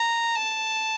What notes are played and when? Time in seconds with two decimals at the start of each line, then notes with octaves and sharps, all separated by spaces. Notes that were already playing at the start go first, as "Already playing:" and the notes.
Already playing: A#5
0.35 A5